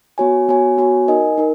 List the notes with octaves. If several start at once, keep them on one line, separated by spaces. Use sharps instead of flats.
B3 F#4 C#5 G#5
B3 F#4 C#5 G#5
B3 F#4 C#5 G#5
D#4 A#4 D#5 G#5
D#4 A#4